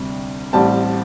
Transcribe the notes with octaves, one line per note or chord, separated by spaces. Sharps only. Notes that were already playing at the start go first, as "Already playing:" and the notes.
Already playing: D2 C3 G3 D4
A1 A2 G3 C4 A5